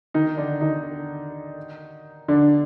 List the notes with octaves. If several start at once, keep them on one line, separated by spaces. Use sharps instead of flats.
D#3 D#4
D3 D4
D#3 D#4
D3 D4